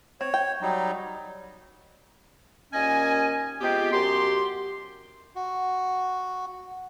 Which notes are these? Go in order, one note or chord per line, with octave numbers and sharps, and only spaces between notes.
C4 C#5
G5
F#3 G3 D#4
D#2 A#2 C#4 D#5 G#5
C3 G#3 B3 F4 G4
F#2 G4 C6
F#4